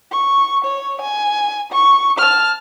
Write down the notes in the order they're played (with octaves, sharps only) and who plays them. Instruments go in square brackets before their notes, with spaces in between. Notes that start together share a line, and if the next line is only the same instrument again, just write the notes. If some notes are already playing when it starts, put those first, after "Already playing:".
[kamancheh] C#6
C#5
G#5
C#6
A5 F6